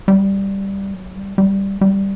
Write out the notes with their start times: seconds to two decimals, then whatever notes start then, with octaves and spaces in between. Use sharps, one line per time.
0.08 G3
0.94 F#3
1.16 G3
1.38 G3
1.81 G3